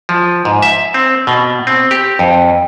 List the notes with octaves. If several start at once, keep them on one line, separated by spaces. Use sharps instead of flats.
F3
G#2
E5
C4
B2
C4
G4
F2